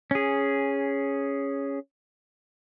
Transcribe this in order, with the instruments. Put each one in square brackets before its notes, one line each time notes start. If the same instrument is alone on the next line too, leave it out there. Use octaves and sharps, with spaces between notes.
[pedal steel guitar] C#4 G#4